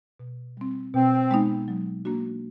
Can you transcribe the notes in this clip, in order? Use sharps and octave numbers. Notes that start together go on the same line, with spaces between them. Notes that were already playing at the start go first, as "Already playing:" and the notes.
B2
G3 C4
B2 C4
G#3 B3 D#4
F#3
A#3 D4 F#4